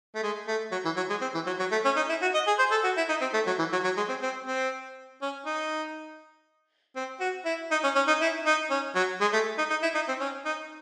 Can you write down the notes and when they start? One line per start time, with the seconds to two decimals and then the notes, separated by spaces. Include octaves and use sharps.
0.15 A3
0.23 G#3
0.48 A3
0.72 F#3
0.85 E3
0.96 F#3
1.09 G#3
1.21 C4
1.34 E3
1.46 F#3
1.59 F#3
1.71 A3
1.85 C#4
1.96 D#4
2.09 E4
2.22 F#4
2.34 D#5
2.47 G#4
2.59 C5
2.71 A4
2.84 F#4
2.97 E4
3.09 D#4
3.21 C4
3.34 A3
3.47 F#3
3.59 E3
3.72 F#3
3.84 F#3
3.97 G#3
4.09 C4
4.22 C4
4.46 C4
5.22 C#4
5.45 D#4
6.96 C4
7.20 F#4
7.45 E4
7.71 D#4
7.84 C#4
7.95 C#4
8.07 D#4
8.21 E4
8.46 D#4
8.70 C#4
8.95 F#3
9.21 G#3
9.33 A3
9.58 D#4
9.70 D#4
9.82 E4
9.95 D#4
10.08 C4
10.20 C#4
10.45 D#4